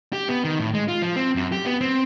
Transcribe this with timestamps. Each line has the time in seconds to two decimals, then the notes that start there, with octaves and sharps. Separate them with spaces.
0.13 G4
0.29 B3
0.44 D#3
0.59 A2
0.74 G#3
0.88 F4
1.02 F3
1.16 C4
1.36 F#2
1.52 G4
1.66 B3
1.81 C4